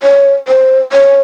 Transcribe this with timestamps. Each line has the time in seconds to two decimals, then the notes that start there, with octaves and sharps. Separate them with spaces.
0.03 C#5
0.48 C5
0.92 C#5